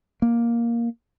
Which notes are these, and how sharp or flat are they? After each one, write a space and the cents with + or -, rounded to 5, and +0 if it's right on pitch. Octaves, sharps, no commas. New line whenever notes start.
A#3 +5